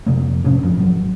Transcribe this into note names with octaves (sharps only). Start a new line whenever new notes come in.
F2 C3 A#3
G#2 C3 C#4 D4
A1 F#2 F3
G#1 F#3